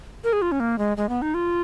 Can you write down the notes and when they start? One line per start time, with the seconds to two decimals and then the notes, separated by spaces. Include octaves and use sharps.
0.24 A#4
0.33 G#4
0.42 F4
0.52 C#4
0.60 A#3
0.78 G#3
0.97 G#3
1.09 B3
1.22 D#4
1.34 F4